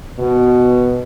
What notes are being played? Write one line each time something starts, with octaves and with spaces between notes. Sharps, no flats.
B2